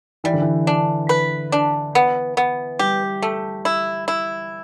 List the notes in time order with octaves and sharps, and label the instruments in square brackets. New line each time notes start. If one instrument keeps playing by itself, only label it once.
[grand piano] E3 [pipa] G3
[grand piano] D3
E3
[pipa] D4
B4
D4
B3
B3
[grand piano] G3 [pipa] G4
[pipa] A3
E4
E4